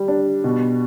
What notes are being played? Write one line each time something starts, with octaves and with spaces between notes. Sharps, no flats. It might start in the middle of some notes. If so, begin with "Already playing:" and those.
Already playing: G3
D4
B2